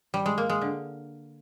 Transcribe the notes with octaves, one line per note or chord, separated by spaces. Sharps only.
G3
G#3
A#3
G#3
D3